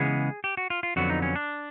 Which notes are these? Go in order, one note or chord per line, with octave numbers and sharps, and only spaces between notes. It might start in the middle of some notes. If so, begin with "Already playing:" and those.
Already playing: C#3 E3 G#3 B3 G#4
G4
F#4
F4
F4
F2 D3 F#3 B3 F#4
D#4
C#4
D4